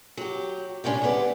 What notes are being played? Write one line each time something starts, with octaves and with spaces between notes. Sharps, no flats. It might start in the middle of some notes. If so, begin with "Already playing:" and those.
F#3 G4
A2 C3 G3 C#4 D4
D2 G3 B3 A#4 D5